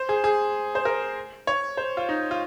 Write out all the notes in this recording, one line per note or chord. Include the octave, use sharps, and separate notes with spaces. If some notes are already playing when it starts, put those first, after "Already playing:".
Already playing: C5
G#4
G#4
C5
A#4
C#5
C5
F4
D#4
F4